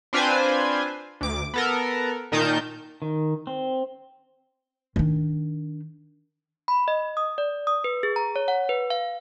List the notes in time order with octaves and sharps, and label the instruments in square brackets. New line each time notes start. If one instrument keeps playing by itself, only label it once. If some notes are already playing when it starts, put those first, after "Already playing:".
[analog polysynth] C4 D4 F4 B4 C5 G#5
D2 D6
B3 A4 A#4
A#2 D#3 D#4 A#4 A5 G6
[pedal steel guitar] D#3
C4
[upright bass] D#3 D4
[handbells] B5
D#5
D#6
D5
D#6
B4
G#4
A#5
C#5
F#5
B4
F5